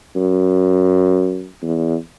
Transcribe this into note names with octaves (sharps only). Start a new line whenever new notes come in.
F#2
E2